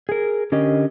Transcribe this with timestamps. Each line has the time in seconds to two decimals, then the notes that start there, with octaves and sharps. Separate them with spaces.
0.09 G#4 A#4
0.52 D3 C#4 G4 A#4 D#5